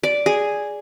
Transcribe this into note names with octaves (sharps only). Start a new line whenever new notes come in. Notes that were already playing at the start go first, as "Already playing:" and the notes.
D5
G#4